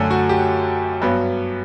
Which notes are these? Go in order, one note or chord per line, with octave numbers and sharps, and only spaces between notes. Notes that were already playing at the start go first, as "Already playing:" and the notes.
Already playing: F#2 D3 A3
F#4
G4
G2 F#3 B3